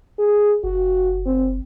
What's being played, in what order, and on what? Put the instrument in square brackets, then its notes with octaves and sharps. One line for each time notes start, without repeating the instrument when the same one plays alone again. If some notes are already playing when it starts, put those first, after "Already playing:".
[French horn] G#4
[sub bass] F#1 [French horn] F#4
[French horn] C4